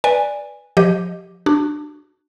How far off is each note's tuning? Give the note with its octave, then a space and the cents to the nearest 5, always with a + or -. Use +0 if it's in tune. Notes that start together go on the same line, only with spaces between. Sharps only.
B4 -5 D5 +0 G#5 -15
F3 +25 G4 +0 D#5 +0
D4 +20 F#4 +15